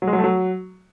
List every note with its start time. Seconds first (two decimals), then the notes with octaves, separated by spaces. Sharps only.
0.02 F#3
0.07 G#3
0.13 F#3
0.18 A3
0.24 F#3